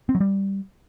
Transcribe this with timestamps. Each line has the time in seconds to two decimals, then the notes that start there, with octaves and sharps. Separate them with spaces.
0.09 C4
0.15 F#3
0.20 G3